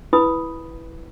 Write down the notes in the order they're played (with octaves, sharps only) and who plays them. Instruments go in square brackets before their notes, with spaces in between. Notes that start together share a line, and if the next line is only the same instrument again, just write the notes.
[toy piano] E4 B4 G#5 B5 D#6